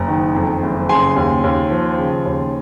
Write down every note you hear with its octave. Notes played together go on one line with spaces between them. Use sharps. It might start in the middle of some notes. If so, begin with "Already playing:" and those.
Already playing: F#1 A#5
D#3
F2
F#1
C#3 G#5 C6
D#2
D#2
F3
C#3
D#2